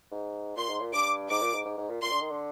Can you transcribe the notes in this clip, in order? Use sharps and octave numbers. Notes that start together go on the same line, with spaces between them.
G#2
A#2 C6
G#2
A#2
G2 D6
G#2 D6
A#2
G#2
G#2
G#2
A#2
A#2 C6
D3
D#3
D3